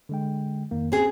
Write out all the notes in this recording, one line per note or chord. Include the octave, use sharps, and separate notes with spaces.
D3 G#3 G5
F2 D#3 A#3
C4 C#4 G#4